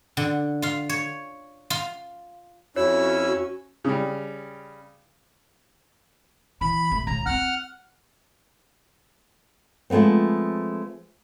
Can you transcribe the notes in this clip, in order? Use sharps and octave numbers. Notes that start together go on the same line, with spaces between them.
D3
F4 F5
C#5
F4
F2 C#4 E4 F#4 C#5 E6
C#3 G3
E3 B5
B1 A3
C#2 C#3 A#5
C4 D#4 F#5 F6
F3 G#3 A3 B3 C4